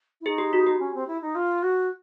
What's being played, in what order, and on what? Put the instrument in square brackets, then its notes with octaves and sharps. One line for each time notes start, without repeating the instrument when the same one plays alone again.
[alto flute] E4
[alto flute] D#4 [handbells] G#4
[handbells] G4
F#4
G4
[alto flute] C#4
C4
E4
D#4
F4
F#4